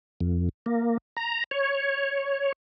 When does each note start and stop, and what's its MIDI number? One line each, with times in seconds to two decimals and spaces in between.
0.21 0.49 41
0.66 0.98 58
1.17 1.44 82
1.51 2.52 73